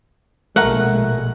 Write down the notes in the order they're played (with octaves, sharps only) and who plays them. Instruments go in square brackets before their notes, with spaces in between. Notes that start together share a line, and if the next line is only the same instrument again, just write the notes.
[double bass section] A#1 B2 G#3 [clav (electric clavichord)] A3 A#4 [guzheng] F#5